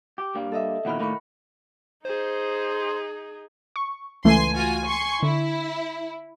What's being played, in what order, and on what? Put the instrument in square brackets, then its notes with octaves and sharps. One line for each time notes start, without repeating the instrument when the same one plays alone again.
[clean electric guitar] G4
G2 G3 A#3
[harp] A4 D#5 E5
[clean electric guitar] E2 A#2 D#3 [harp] F#5 B5 F6
[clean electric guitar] A2 D#3 A#3 [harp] A#4 B5 C#6
[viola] D#4 G#4 [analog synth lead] C5
[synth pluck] C#6
[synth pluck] C#2 E3 A3 [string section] G#5 C6
[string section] F4 F#4 G#5
G#5 C6 C#6
[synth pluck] D3 [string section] E4